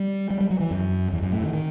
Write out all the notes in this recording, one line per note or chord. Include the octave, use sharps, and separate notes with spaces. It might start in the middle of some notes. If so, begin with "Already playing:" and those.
Already playing: G3
G3
G3
F#3
E3
F#2
E2
F#2
A2
D#3
D#3